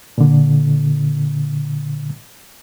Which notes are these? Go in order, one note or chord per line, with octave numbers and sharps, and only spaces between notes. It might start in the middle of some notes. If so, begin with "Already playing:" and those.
A#2 D3